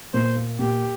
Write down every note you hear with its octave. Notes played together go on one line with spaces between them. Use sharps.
A#2 C5
A#3
A#2 G4